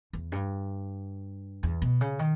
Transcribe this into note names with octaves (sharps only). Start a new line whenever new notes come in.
E2
G2
E2
B2
C#3
D#3